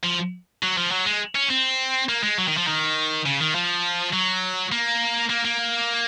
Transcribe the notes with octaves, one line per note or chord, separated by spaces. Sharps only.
F3
F#3
F3
F#3
G#3
C#4
C4
A#3
G#3
F#3
D#3
F3
D#3
C#3
D#3
F3
F#3
A#3
A#3
A#3